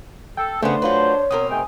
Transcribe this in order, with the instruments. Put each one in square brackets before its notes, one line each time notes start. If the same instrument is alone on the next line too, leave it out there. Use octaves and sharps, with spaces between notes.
[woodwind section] A4 [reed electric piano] G5
[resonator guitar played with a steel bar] C#3 B3 [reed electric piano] A3 [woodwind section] D4 C5
[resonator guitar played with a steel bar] F#3 F4 B4 [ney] C#5
[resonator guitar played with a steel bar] B2 C4 A#4 [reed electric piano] D#6
[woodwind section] G#2 A3 G5 [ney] G#5